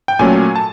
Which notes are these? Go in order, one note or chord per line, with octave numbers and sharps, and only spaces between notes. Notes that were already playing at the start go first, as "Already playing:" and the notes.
G5
A#2 F#3 A3 C#4 G#5
A5